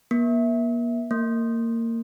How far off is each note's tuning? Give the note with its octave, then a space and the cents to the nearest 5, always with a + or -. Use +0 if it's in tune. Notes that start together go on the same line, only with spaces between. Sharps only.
A#3 +40
A#3 -25